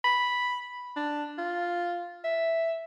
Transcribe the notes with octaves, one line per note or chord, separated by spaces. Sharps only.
B5
D4
F4
E5